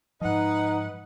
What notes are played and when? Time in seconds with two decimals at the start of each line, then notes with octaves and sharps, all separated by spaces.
0.21 G#2 F3 D#4 B4 D#5 F#5